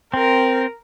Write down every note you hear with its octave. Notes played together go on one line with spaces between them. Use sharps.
C4 A#4